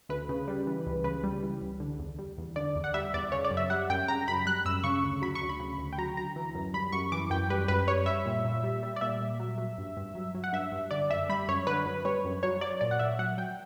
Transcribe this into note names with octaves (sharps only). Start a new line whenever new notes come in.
D2 B4
C#3
G3
E3
C#2
C#3 B4
G3
E3
C#2
D3
E2
G3
E2
D3 D5
E2
F#5
G3 E5
E2 D5
C#3 C#5
D5
F#2
E5
G3 F#5
F#2 G5
C#3 A#5
F#2 B5
G3 F#6
F#2 E6
C#3 C#6
D2
F#3 B5
C#6
D2
B5
C#3
D2
G5
F#3 A#5
D2 A#5
E3
F#2
G3 B5
F#2 C#6
E3 D6
F#2 G5
G3 B4
F#2 B4
G3 C#5
G3 E5
A#2
A#2
G3
G3
D5
A#2 E5
A#2
F#3
F#3
G2
G2
F#3
F#3
F#5
G2 E5
G2
D3 D5
F#2 E5
G3 B5
F#2 C#5
D3 B4
F#2
G3 C#5
F#2
F#3 C#5
F#3 D5
A#2 D5
F#5
A#2 E5
F#3 F#5
F#3 G5